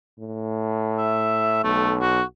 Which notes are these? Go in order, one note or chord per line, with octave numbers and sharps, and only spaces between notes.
A2
E5
B1 A3
F#4